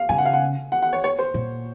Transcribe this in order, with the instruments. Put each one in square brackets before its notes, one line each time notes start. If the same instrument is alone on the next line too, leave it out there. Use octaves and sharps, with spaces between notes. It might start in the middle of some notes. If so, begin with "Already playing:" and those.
Already playing: [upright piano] F5
[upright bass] C#3 [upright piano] G#5
[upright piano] F#5
F5
F#5
F#5
F#5
C#5
C#5
C5
[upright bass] A#2